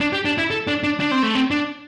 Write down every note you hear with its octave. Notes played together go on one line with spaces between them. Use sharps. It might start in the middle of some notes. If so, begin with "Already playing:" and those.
D4
G4
D4
E4
A4
D4
D4
D4
C4
A3
C4
D4